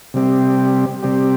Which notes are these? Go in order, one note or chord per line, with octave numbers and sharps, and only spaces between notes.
C3 G3 C4 G4
C3 G3 C4 G4